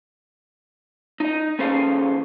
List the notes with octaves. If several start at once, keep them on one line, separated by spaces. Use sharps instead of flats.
D#4 D#5
D#2 C#4 G#4 A4 C5 F5